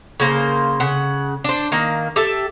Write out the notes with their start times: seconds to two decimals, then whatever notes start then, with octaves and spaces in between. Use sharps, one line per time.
0.20 C#3 A#3 C5
0.80 C#3 F#5
1.44 D4 C5
1.72 D#3 A#3
2.16 G4 A4 E5 A5